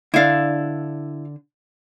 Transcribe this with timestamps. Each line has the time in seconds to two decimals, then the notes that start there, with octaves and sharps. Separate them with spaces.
0.14 D3 D4 E4 F5